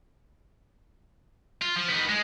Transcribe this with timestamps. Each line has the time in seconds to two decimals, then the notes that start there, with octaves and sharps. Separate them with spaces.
1.61 F4
1.76 F3
1.89 D#3 B3
2.09 G#3